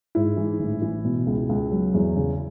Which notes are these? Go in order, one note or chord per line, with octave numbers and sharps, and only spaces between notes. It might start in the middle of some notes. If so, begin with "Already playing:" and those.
G#2 E4
E3
A1
E3
B2
C#2
C#2
F#3
E2
C#3